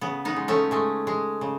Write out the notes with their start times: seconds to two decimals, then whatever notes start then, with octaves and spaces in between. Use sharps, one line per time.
0.01 C#3 B3
0.25 B3 D#4
0.36 G#3
0.48 A3 C#4
0.71 G#3 A3
1.07 G#3
1.41 C#3